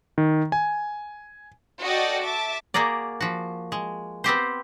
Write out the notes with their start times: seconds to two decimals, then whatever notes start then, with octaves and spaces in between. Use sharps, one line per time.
0.18 D#3
0.52 G#5
1.82 F#4 A4 D5 D#5 G5
2.23 E5 A5 D6
2.74 A#3 F#4 G#4 A#4 D5
3.21 F3 F#4
3.72 G#3
4.24 B3 C4 G4 C5